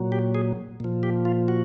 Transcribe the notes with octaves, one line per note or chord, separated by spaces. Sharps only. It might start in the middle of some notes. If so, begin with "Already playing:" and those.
Already playing: A#2 F#3
G4
G#4
A#2 F3
G4
F4
F#4